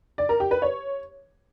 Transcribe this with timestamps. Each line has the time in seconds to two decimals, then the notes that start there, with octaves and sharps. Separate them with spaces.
0.18 D5
0.29 A#4
0.40 G4
0.51 B4
0.62 C#5